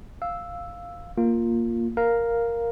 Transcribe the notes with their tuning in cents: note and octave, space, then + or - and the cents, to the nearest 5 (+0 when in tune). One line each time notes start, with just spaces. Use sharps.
F5 +0 E6 +0
A#3 +0 F4 +0
A#4 +0 F5 +0